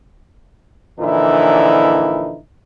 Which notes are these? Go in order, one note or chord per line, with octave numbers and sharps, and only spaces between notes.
A#2 D3 E3 F3 D#4 E4